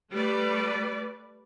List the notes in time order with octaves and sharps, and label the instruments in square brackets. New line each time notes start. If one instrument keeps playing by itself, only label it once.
[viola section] G3 A3 B4 D5